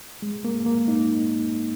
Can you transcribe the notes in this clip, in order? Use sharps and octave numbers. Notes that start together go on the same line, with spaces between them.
G#3
A#3
A#3
D#4